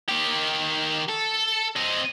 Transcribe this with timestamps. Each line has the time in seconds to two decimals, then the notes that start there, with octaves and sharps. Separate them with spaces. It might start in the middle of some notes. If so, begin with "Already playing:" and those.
0.08 D#3 G4
1.09 A4
1.76 C4 D#5